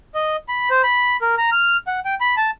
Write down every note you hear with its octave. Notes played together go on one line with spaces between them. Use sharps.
D#5
B5
C5
B5
A#4
A#5
F6
F#5
G5
B5
A5